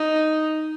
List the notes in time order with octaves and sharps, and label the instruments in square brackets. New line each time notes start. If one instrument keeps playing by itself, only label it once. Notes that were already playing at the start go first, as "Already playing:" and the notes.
Already playing: [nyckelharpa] D#4